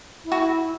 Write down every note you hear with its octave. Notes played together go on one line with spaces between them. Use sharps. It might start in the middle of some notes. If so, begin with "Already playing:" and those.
E4
F#4